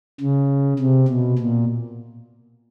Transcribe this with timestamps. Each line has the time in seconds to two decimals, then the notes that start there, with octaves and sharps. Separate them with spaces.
0.20 C#3
0.79 C3
1.08 B2
1.38 A#2